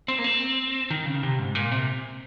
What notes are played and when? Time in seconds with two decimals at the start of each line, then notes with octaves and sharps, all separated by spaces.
0.08 C4
0.19 A#3
0.24 C4
0.90 D#3
1.06 C#3
1.23 C3
1.39 G#2
1.55 A#2
1.72 C3